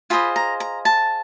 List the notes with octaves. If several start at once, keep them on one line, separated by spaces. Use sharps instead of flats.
F4 G#4 C5 D#5 B5
A#5
A#5
A5